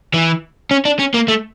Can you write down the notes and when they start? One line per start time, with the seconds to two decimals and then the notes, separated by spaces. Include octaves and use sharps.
0.14 E3
0.71 C#4
0.85 D4
0.99 C#4
1.14 A#3
1.28 A3